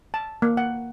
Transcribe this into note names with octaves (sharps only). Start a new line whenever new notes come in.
A5
A#3
F#5